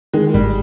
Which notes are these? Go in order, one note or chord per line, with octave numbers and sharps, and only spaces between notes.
D#3 G#3
G#1 G3